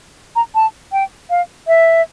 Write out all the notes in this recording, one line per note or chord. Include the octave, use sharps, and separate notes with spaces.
A#5
A5
G5
F5
E5